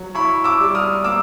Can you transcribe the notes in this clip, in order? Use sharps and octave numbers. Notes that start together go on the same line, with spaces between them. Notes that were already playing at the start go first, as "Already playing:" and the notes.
Already playing: F#3
E4 B5 C#6
D6 E6
G3
D#6 F6
A#3 D6 E6